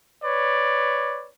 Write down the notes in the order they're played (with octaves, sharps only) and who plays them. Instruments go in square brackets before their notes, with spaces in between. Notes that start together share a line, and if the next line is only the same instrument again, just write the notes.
[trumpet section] B4 C#5 D5